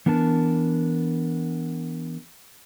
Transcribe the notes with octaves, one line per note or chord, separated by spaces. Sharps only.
E3 B3 D4 A#4 A5